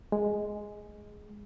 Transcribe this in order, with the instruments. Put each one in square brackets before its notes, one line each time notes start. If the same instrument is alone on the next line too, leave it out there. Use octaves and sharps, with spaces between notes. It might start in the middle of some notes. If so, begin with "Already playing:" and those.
[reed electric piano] G#3